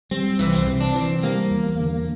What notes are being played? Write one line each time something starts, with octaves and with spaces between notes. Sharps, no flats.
G3 C4
C2 E3
C4
C3
D4
E3 C4
G3 A#3
E2
D3